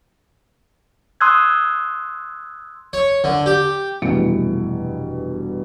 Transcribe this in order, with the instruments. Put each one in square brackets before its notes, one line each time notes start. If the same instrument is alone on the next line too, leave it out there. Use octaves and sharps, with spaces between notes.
[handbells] C6 D#6 E6 F#6 G#6
[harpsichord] C#5
D3
G4
[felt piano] F1 G2 B2 E3 C#7 D7